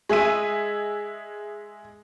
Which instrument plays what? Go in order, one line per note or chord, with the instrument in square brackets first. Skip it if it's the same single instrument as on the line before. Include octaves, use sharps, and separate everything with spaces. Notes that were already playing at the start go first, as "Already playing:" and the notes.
[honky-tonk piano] G#3 G#4 E5 D#7